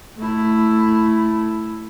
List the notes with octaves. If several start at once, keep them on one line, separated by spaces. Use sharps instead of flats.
A3 E4